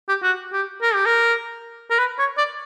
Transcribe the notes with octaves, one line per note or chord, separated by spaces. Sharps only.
G4
F#4
G4
A#4
G4
A#4
A#4
B4
C#5
D5